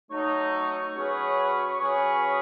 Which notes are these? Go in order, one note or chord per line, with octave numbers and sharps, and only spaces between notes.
F#3 A3 D#4 C#5
F#3 C#4 G#4 B4
F#3 C#4 G#4 B4 C#5